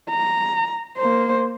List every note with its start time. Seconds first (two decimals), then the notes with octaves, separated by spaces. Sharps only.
0.10 A#5
0.97 A#3 C5